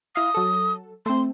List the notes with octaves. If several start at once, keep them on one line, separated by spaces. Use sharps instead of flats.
E4 F5 D#6
F#3 A4
A3 C4 C6